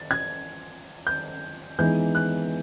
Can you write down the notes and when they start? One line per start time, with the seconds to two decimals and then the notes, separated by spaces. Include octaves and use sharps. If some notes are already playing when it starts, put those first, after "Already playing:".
Already playing: A6
0.11 G#6
1.07 G6
1.79 E3 G#3 B3 D#4 G6
2.15 F#6